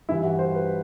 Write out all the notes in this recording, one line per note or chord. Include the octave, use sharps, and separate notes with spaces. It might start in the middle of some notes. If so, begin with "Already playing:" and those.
G2 E3 G3 E4
F#4
C5
B4